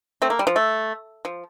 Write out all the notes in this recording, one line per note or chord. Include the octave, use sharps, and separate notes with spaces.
A3 C4
A#3
G3
F3
A3
F3